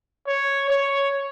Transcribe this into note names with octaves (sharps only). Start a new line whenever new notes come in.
C#5
C#5